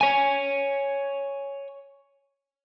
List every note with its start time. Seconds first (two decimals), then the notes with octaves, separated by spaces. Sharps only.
0.01 C#5 G#5